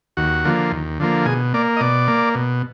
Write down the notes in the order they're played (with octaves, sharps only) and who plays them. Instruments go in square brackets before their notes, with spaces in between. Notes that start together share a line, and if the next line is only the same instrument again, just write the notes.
[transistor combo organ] D#2 F#4
D3 F3 A#3
D#2
D3 F3 A#3
B2 G#4
A#3 D5
D#5
B2 D5
A#3
B2